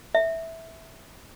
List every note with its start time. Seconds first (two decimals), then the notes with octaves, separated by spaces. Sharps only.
0.15 E5